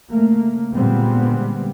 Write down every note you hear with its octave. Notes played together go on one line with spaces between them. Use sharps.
C#3 A3 A#3
A#2 D3 G3 G#3 B3 C4